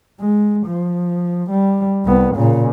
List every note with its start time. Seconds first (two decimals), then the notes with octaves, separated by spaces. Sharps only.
0.20 G#3
0.67 F3
1.51 G3
2.05 C2 B3
2.36 A#2 C#3